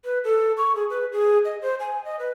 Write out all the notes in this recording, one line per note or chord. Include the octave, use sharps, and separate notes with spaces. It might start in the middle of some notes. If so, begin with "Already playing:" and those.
B4
A4
C#6
G#4
B4
G#4
D#5
C5
G#5
D#5
B4